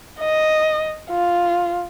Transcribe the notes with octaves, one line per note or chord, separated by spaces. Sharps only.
D#5
F4